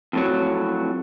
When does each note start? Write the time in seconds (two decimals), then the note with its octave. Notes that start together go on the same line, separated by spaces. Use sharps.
0.13 F2 A2 F#3